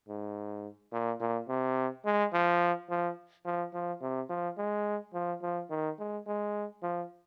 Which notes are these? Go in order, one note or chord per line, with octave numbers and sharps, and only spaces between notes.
G#2
A#2
A#2
C3
G#3
F3
F3
F3
F3
C3
F3
G#3
F3
F3
D#3
G#3
G#3
F3